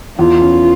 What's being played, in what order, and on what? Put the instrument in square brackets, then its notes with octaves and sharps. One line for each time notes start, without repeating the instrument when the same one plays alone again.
[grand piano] E2 [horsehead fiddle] F4
[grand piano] C#4